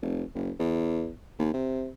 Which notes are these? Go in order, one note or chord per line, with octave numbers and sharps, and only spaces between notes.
F1
F#1
E2
D#2
C3